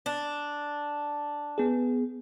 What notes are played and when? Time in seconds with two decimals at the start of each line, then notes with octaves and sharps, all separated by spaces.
0.06 D4
1.58 B3 G#4